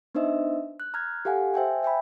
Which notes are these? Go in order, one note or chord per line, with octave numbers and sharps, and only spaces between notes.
B3 D4 D#4 C5 D#5 E5
F#6
A#5 F6 F#6 G#6
G4 A4 F5 F#5 G#5
C5 E5 G5 G#5
E5 G5 G#5 B5